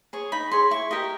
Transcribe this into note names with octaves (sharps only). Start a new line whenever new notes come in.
G#4 C#5
D#4 B5
G#4 C#5 C6
E4 C#6
G4 A#4 D#5